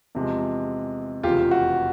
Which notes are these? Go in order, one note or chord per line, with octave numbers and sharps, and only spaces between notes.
E2 C3 F3 G#3
F1 E2 C#3 F4 G4
F#4